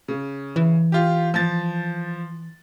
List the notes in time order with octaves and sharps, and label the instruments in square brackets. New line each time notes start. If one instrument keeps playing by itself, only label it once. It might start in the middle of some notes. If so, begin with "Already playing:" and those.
[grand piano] C#3
[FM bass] E3
[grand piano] F4 G4
F3 A6